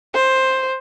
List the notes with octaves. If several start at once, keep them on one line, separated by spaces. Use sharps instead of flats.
C5